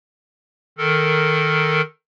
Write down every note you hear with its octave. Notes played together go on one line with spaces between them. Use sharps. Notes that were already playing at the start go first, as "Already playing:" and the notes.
D#3 A4 A#4